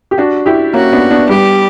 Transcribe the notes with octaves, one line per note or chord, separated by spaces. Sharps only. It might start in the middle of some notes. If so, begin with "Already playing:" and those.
G4
D4 F#4
E4 G4
A#3 C#4 F#4
B3 D4
B3 D4
G3 B3 G4